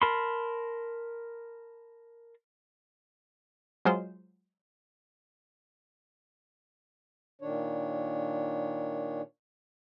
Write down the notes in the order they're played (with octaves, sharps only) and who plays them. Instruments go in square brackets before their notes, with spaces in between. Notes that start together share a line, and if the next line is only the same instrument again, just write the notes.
[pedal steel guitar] A#4 A5 B5 C6
[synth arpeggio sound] F#3 G#3 F4 C5
[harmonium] A#2 D#3 D4 C#5